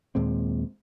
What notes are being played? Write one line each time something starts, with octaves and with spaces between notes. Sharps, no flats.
D#2 A#2 G#3 C4